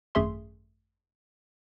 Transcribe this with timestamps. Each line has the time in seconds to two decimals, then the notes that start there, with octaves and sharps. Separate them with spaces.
0.15 G#1 F#2 A3 G#4 E5 C6